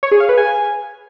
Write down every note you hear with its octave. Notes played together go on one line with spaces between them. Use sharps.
C#5
G#4
F5
B4
G#5